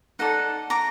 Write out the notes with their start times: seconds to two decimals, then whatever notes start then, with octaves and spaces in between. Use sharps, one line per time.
0.19 D#4 A4 D5 F#5
0.70 A#5 D6